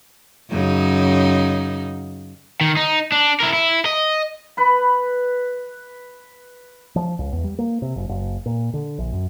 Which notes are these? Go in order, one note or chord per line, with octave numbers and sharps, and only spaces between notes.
F#2 C#3 D#4
D#3
D#4
D4
E4 A#4
E4
D#5
B4 B5
F3
C#2
E2
G3
A#3
C3
F#1
F#1
A#2
D3
A#1
F#2